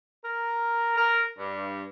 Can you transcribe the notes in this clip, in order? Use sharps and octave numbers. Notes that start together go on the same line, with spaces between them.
A#4
A#4
G2